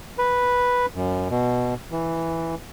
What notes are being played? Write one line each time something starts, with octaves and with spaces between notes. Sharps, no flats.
B4
F#2
B2
E3